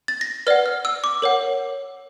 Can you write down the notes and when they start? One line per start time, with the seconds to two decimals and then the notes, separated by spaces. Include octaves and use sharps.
0.08 A6
0.21 A#6
0.47 B4 D5 F#5 F6
0.66 F6
0.85 E6
1.04 D6
1.22 A#4 C#5 F#5